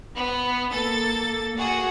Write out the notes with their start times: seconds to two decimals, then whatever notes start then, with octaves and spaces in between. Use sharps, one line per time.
0.15 B3
0.70 A#3 A4 A6
1.56 A#3 F#4 G#4 F#5